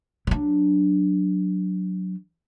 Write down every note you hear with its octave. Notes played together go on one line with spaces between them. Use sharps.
F#3 D4